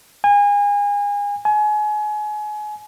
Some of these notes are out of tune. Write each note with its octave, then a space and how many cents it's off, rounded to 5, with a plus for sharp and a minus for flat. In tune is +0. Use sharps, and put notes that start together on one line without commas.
G#5 -30
G#5 +30